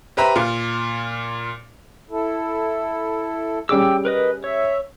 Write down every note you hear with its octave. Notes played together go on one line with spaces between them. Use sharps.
G4 B4 C5 E5 A#5
A#2 F4
E4 A4
G3 C#4 G#4 G5 D6 E6
A#4 B4 D#5
C#5 E5